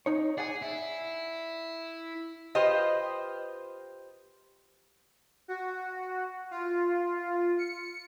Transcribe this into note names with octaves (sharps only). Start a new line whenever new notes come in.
D#4 C#5
G#4 D5 F#5 G#5
E4
F4 G4 B4 C5 D#5
F#4
F4
C#7